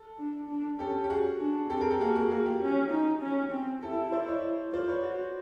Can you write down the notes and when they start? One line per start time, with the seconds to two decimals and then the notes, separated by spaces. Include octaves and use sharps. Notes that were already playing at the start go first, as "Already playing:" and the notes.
Already playing: A4
0.18 D4
0.49 D4
0.79 C#4 G4 A4
1.04 G4
1.10 F#4 G#4
1.40 D4
1.70 C4 G4 A4
1.81 G#4 A#4
1.91 G4 A4
2.01 A#3 F#4 G#4
2.15 F#4 G#4
2.31 A#3 F#4 G#4
2.46 F4 G4
2.62 C#4
2.91 D#4
3.22 C#4
3.52 C4
3.83 E4 G4 A4
4.12 C5 D5
4.27 C#5 D#5
4.73 F4 C5 D5
4.88 B4 C#5
5.04 F#4